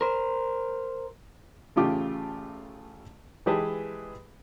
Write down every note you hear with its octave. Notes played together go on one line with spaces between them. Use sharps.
A#4 C5
A1 C#3 A3 F4 G4 D6
E3 G#3 G4 G#4 B4 A5